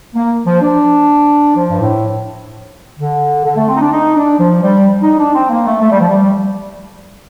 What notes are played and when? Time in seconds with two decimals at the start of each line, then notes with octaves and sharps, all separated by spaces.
0.14 A#3
0.46 F3
0.62 D4
1.57 F3
1.70 G2
1.80 A2
2.98 D3
3.45 D3
3.56 A3
3.68 C4
3.75 D#4
3.80 D4
3.92 D#4
4.16 D4
4.39 F3
4.63 G3
5.02 D#4
5.18 D4
5.35 C4
5.50 A#3
5.66 A3
5.81 A3
5.91 G3
6.00 F3
6.09 G3